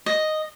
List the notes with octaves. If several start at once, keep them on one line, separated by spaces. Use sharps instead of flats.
D#5